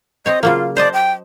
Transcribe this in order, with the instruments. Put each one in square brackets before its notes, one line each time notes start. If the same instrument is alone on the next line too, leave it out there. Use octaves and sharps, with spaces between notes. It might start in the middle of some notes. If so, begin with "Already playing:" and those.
[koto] C4 C#5 [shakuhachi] D#5
[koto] C#3 F#3 A#3 [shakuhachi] F4
[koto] C5 D#5 A5 [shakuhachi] D5
[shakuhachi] G5